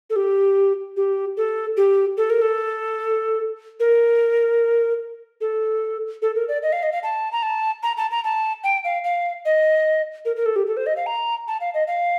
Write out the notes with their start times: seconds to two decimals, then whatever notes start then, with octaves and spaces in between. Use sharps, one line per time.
0.10 A4
0.16 G4
0.97 G4
1.37 A4
1.77 G4
2.17 A4
2.30 A#4
2.42 A4
3.80 A#4
5.41 A4
6.22 A4
6.35 A#4
6.48 D5
6.62 D#5
6.72 F5
6.83 D#5
6.92 F5
7.03 A5
7.32 A#5
7.42 A5
7.83 A#5
7.97 A5
8.11 A#5
8.24 A5
8.64 G5
8.84 F5
9.04 F5
9.45 D#5
10.25 A#4
10.36 A#4
10.46 A4
10.56 G4
10.67 A4
10.77 C5
10.86 D#5
10.96 F5
11.06 A#5
11.48 A5
11.61 F5
11.74 D#5
11.87 F5